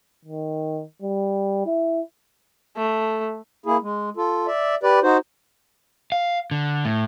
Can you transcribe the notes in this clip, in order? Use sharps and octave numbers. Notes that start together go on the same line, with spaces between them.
D#3
G3
E4
A3
A#3 E4 G#4
G#3
F4 A4
D5 E5
G4 B4 D5
D#4 F#4 C5
F5
D3
A2